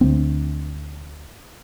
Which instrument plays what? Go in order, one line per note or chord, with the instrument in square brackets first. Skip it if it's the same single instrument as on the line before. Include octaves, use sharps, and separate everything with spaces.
[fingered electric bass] D2 C4